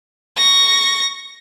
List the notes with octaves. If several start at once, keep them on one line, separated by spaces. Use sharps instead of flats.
C#6 A#6